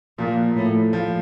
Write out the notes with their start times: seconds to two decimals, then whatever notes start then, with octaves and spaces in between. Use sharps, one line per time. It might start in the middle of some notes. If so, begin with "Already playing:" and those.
0.18 A#2 F3
0.56 A2
0.93 F3